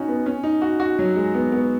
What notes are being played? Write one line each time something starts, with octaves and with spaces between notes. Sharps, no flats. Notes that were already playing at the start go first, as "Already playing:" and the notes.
Already playing: C#4 D#4 F#4
B3
C#4
D#4
F#4
F#4
F#3
G#3
B3
B3